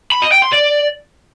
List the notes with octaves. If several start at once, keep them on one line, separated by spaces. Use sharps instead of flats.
B5
D#5
G5
C6
D5